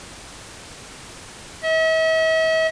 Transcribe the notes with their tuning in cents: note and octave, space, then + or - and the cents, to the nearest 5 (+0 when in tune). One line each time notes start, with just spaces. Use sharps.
E5 -45